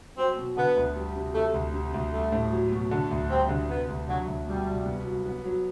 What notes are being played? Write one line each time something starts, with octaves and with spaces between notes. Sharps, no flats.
F#3 C4
B2
D3 B3
D2
G3
C3
C3 A3
D2
C3
D2
G3 A3
A2
F#3
B2
D3
D2
G3 C4
D3
C3 B3
D2
D3 F#3
D2
B2 G3
C2
B3
F#3
B3
F#3